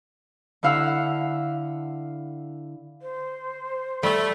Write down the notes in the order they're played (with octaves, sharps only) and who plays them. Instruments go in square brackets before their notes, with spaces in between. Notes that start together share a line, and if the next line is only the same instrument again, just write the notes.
[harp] D3 E4 F5 F#5 E6
[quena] C5
[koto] G3 E5 [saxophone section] A3